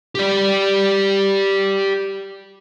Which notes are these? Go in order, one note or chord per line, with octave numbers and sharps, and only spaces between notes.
G4 D5